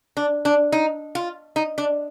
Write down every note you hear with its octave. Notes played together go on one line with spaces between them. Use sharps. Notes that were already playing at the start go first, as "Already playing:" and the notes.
D4
D4
D#4
F4
D#4
D4